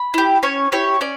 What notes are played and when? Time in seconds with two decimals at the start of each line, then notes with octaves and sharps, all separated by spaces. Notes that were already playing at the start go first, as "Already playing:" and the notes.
Already playing: B5
0.14 E4 G4
0.43 C#4 C#5
0.72 E4 G4 C#5
1.01 C#4 D5